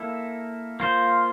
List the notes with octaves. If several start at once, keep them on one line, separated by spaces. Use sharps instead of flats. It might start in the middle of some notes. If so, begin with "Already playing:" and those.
Already playing: A#3 E4 A4
A#3 F4 C5